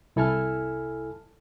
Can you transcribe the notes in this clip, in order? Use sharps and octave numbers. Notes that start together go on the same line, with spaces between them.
C2 E4 A4 G#5 A5 F6